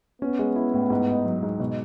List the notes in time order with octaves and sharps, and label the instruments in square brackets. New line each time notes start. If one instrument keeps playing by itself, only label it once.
[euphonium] B3 [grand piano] C#4
[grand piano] G#3
E4
A2
G#2
D#4
F#3
G#2
B2